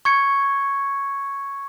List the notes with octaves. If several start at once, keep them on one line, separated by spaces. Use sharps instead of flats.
C#6 G#6 C#7